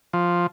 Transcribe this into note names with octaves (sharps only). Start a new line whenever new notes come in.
F3